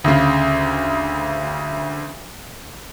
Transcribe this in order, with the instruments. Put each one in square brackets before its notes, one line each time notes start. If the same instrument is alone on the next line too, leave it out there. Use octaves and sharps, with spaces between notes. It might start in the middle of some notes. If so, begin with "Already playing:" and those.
[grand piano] D2 C#3